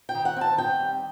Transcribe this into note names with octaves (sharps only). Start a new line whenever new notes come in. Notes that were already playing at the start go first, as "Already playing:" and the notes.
G5
D#3
F#5
C4 A5
D#3 G5
G3